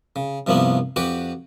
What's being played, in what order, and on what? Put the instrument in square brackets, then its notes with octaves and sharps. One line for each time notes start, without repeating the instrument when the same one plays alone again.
[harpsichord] C#3
G2 C3 F3 A#3 B3 E4
F2 F#4 G4 B4 D6